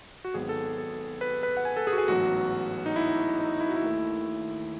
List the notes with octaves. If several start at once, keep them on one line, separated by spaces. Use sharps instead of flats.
F#4
G#1 G#2 F#3 B3 G#4
A4
A4
B4
B4
F#5
G#5
A4
G#4
F#4
G#4
A1 G#2 F#3 B3 F#4
D#4
E4
D#4
E4
F#4
E4
D#2 D#3 A3